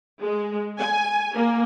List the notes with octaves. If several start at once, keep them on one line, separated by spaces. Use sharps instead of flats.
G#3
G#5
A#3